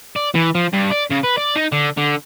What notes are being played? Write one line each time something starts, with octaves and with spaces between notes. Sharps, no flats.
D5
E3
F3
G2
D5
C#3
B4
D5
D#4
D3
D3